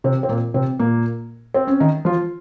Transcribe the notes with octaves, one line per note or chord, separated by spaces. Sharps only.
C3 C4
C4
A#2 A#3
C3 C4
A#2 A#3
C4
C#4
D#3 D#4
F3 F4